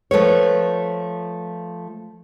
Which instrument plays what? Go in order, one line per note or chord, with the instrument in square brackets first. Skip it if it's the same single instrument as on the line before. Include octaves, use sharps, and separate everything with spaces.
[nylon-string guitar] F3 A3 B4 C#5